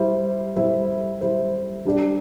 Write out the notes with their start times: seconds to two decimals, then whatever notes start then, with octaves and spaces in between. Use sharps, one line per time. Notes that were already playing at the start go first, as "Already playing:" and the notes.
Already playing: G3 E4 C5
0.56 G3 E4 C5
1.21 G3 E4 C5
1.85 G3 D4 G4 D5